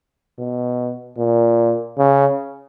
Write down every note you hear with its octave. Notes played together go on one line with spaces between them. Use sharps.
B2
A#2
C#3